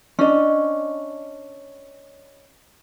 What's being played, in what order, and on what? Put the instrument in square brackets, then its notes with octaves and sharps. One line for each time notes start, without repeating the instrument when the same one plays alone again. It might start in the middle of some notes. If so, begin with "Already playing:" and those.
[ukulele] C#4 D4 D#5